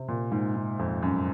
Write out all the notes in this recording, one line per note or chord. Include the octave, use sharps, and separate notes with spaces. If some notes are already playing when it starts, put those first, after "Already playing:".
Already playing: C3
A#2
G#2
G#2
F2
F#2